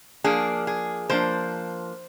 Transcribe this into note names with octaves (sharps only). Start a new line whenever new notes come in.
F3 A#3 D4 G#4
G#4
F3 A#3 D4 C5